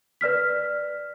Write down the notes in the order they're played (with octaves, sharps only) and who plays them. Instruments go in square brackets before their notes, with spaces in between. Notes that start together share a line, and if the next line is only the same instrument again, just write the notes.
[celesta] B4 D5 F6 B6